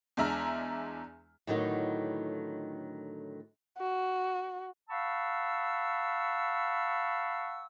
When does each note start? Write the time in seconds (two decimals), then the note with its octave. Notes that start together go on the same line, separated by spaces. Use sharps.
0.17 E2 G#3 D4 E5 A#5 F6
1.47 A2 D3 D#3 F#3 B3 D#4
3.78 F#4
4.89 F5 F#5 A5 B5 C#6 E6